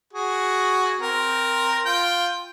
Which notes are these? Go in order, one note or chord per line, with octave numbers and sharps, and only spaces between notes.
F#4 G#4
C4 A#4
F4 G5